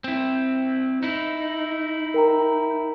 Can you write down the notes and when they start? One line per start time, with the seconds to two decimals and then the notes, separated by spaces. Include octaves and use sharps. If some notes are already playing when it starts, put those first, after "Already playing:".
0.04 C4 E4
1.03 D#4 E4
2.14 A#4 G5 A#5